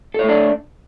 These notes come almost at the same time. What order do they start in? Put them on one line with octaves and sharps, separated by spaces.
A4 C#5 A3 D4